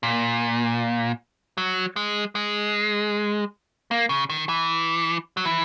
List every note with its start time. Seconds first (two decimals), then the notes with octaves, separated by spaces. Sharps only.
0.03 A#2
1.58 F#3
1.96 G#3
2.35 G#3
3.91 A#3
4.09 C#3
4.30 D#3
4.49 E3
5.37 F#3
5.45 E3